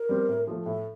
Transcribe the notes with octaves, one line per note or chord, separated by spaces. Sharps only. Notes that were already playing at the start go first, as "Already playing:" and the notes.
Already playing: A#4
G3 C4
A2
F3 A3
A2 A4